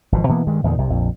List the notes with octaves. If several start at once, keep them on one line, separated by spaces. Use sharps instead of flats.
G#1 B2 F3
B2 E3 A#3 B3
G2 D#3 G#3
E2 A#2 D3 D#3
C2 C3
A#1 F2